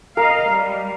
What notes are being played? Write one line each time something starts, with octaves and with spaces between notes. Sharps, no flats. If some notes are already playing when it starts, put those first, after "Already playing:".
A#4 D#5 F5
G3